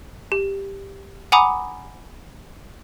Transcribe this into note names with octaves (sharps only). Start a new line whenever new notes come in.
G4
F#5 G#5 A#5 B5 D6 D#6